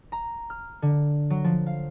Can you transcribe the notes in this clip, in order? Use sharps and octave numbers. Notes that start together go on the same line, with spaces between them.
A#5
F6
D3
F#3
F3
F5